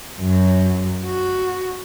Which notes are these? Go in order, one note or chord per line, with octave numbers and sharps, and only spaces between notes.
F#2 F#3
F#4